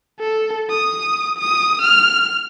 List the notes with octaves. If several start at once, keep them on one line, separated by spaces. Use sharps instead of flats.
A4
D#6
D#6
F6